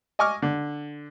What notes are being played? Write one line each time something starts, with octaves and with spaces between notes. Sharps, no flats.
D#5 G#5 C#6 D6 F6
D3